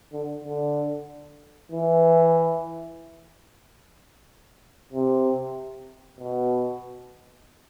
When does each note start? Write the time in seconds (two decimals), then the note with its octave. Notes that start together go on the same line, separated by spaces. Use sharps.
0.13 D3
0.44 D3
1.72 E3
4.93 C3
6.20 B2